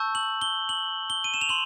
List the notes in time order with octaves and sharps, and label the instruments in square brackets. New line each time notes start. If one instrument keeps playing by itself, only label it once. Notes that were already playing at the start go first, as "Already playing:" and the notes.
Already playing: [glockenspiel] A5 C#6 E6 G6
F#7
G7
F#7
G7
D#7
E7
F7
C6 F#7